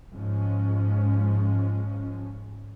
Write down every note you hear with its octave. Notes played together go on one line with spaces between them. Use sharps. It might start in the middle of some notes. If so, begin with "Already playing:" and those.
G#2 F3 G#3 C#4